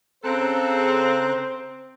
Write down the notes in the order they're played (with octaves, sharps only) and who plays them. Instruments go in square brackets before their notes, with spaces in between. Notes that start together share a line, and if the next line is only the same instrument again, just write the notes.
[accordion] C#3 A#5 F#6 [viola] C4 [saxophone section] A4 [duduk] C5